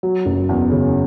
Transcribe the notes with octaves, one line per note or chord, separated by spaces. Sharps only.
F#3
F#1
E2
C#3